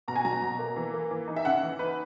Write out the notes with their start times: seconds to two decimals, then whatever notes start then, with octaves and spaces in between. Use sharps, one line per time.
0.08 B2 A#5
0.15 G#5
0.25 F#3 A#5
0.42 B2
0.59 A#3
0.76 E3
0.94 A#3
1.11 E3
1.28 D#4
1.36 E5
1.45 C#3 F#5
1.63 E3
1.79 D#4 B4